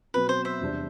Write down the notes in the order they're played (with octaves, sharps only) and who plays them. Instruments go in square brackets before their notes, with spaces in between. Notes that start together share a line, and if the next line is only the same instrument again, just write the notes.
[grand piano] B2 F#3 C4 F#4 [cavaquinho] B4
[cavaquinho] C5
C5 E5
[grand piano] E2 C3 G3 D4